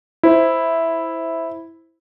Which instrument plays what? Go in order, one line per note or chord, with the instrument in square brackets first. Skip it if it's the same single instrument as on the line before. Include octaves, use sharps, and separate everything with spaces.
[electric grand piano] E4 C5